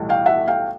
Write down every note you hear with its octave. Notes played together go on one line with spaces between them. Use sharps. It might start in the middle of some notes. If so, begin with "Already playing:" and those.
Already playing: B1 A2 E3 G3
F5 G5
E5 F#5
F5 G5